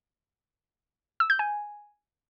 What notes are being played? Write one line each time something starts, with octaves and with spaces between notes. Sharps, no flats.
E6
G6
G#5